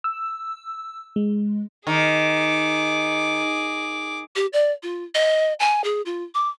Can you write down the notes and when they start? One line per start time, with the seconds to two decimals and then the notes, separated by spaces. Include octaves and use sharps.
0.04 E6
1.16 G#3
1.87 D#3 G#4 D6
4.36 G4
4.53 D5
4.83 F4
5.15 D#5
5.60 G#5
5.84 G#4
6.06 F4
6.34 D6